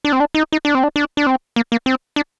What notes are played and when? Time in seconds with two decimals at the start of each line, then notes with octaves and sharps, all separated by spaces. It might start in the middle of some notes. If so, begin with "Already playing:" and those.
0.05 D4
0.12 C4
0.20 D4
0.35 D#4
0.52 D#4
0.65 D4
0.75 C4
0.83 D4
0.96 D4
1.17 D4
1.26 C4
1.56 A#3
1.72 A#3
1.86 C4
2.16 D4